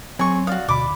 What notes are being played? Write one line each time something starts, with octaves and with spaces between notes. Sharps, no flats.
F#3 C4 G#4 C#6
F#4 D5 F5 D#6
D2 B2 B5 D6